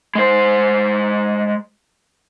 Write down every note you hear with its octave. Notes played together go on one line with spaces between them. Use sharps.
G#3 C5